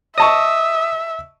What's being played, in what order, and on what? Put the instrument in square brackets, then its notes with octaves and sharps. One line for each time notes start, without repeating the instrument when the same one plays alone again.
[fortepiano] D#5 A5 C#6 [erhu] E5 [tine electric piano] D#6